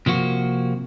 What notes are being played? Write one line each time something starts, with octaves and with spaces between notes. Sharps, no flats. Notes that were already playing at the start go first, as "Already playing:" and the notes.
C3 F3 A#3 F#4